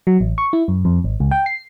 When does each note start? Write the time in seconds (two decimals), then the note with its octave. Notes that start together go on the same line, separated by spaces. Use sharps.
0.07 F#3
0.21 A1
0.38 C#6
0.53 E4
0.68 F#2
0.85 F2
1.04 G#1
1.20 C#2
1.31 G5
1.46 C7